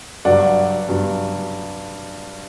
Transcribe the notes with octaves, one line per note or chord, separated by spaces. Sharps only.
G2 F#3 D5 F#5
G2 F#3